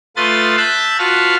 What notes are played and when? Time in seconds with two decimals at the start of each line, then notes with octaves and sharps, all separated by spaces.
0.16 A3 F4 B4 C6 D#6 A6
0.57 E5 A5 E6 F#6 G6 A6
0.99 F4 F#4 B4 A5 F6